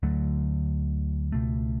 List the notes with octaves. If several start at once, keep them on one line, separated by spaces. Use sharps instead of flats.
D2 D3 F#3 A3
C#2 B2 A3